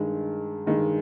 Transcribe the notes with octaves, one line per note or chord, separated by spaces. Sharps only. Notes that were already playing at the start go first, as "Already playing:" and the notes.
Already playing: G2 D#3 G#3
G2 D#3 G#3